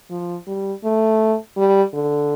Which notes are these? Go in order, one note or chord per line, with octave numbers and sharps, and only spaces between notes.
F3
G3
A3
G3
D3